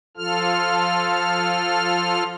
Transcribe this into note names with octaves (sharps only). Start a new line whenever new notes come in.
F3 F4 A4 F6